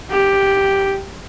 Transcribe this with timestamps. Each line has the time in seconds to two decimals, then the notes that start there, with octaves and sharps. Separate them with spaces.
0.11 G4